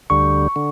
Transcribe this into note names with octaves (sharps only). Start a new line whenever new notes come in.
D2 D3 G3 C#6
D3